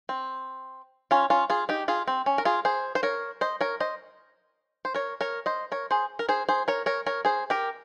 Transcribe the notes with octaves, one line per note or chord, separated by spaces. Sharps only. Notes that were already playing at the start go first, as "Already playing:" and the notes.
C4
C#4 F4
C#4 F4
F4 G#4
D#4 G4
F4 G#4
C4
C#4
A#4
F4 G#4
G#4 C5
C5
A#4 C#5
C5 D#5
A#4 C#5
C5 D#5
C5
A#4 C#5
A#4 C#5
C5 D#5
A#4 C#5
G#4 C5
A#4
G#4 C5
G#4 C5
A#4 C#5
A#4 C#5
A#4 C#5
G#4 C5
G4 A#4